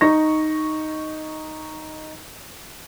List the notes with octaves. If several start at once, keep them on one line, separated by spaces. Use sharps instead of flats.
D#4 C#6 A#6